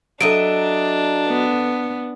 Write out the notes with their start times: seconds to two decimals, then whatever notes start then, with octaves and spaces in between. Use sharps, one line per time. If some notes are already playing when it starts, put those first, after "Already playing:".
0.21 F#3 D4 A4 D#5 E5 D7
1.28 B3